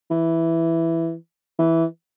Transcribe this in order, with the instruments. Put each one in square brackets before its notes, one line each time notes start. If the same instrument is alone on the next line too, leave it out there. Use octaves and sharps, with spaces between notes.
[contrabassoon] E3
E3